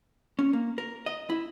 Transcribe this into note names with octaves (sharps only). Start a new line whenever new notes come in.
C#4
A#3
A#4
D#5
E4